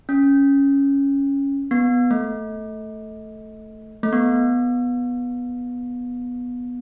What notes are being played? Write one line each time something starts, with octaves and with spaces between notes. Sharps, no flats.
C#4
B3
A3
A3
B3